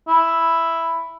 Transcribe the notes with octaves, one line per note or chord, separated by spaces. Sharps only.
E4